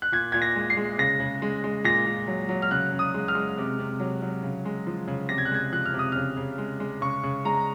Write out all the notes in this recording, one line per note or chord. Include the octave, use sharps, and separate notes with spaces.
F#6
A#2 G#6
A#2 G#6
A#6
G#3
C7
G#3
C#3 A#6
C#3
G#3
G#3
A#2 A#6
A#2
F#3
F#3
F6
C#3 F#6
C#3
D#6
G#3
F6
G#3
C3
C3
F#3
F#3
C#3
G#3
F3
C#3
C3 A#6
G#6
F#6
G#3 G#6
F3 F#6
F6
C3
D#6
C#3 F6
C#3
G#3
G#3
C#3 C#6
C#3
G#3 A#5